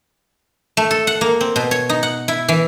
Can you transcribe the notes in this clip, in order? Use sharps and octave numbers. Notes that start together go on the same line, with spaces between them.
A3
A4
F#5
A#3
C4
B2
C#5
D#4
F#5
E4
E3